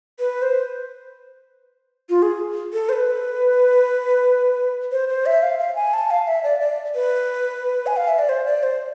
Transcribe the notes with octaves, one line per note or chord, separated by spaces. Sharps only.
B4
C5
F4
G#4
A4
C5
B4
C5
C5
E5
F5
F5
G#5
A5
F5
E5
D5
D5
B4
G#5
F5
E5
D5
C5
D5
C5